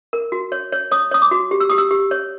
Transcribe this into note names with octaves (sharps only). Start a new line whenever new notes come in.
A#4
F#4
C#5
C#5
C#5 D#6
C#5 D#6
D6
F#4
G4
E6
G4 D#6
E6
G4
C#5